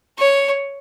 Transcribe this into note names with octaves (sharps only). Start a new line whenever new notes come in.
C#5